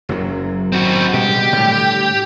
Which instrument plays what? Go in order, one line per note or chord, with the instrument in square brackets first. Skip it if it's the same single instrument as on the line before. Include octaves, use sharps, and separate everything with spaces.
[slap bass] F#1 F#2 F#3
[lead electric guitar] C4 F#4
[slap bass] B2 G3 G#3 [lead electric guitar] G4
[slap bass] A2 D3 G3